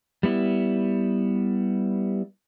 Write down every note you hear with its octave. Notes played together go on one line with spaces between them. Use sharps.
G3 B3 E4